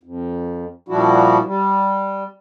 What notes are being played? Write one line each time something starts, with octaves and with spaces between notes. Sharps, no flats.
F2
A#2 F3 G3 D4 E4 F#4
G3